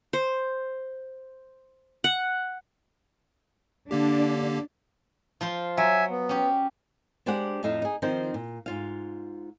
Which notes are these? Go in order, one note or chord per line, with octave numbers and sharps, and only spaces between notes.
C5
F#5
D3 A#3 D4 G4
F3 F4 C5
F#3 E5 G#5
B3
C#4 G4
G#3 D4 G4 C5 D5 F#5
F2 A2 D#4 E5 F5
D#4 G#4
D#3 F3 C4 D#4 C5
A#2
G#2 F4 F5